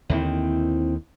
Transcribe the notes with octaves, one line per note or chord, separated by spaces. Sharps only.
D#2 D3 D#3 C4 E4